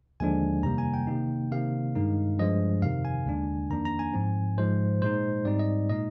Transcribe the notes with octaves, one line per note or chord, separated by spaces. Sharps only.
D#2 D3 F3 G#3 D4 G#5
F2 C3 D#3 G3 A#3 A#5
G#5
G5
C3 D#3 A#3 D#4
C3 D#3 A#3 F5
G2 D#3 G#3 D#4
G2 F3 G#3 D#5
F2 C3 D#3 F5
G#5
D#2 D3 G#3 D4
F2 D#3 A#3 D4 A#5
A#5
G#5
G#2 F3 C4
G#2 F3 G#3 C5
A#2 G#3 D#4 C5
G#2 G3 C4 D#4 D5
D#5
A#2 G#3 D#4 D#5